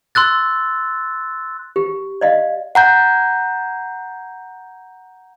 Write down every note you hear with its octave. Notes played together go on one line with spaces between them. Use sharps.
C6 E6 F#6 A6
G4
D5 D#5 F5
F#5 A#5 G6